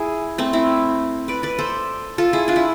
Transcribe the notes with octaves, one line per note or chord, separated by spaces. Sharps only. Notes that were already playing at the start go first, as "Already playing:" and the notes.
Already playing: E4 G#4
A3 C4
C4 E4
B4 D5
B4 D5
A4 C5
F4 A4
E4 G#4
D4 F4
E4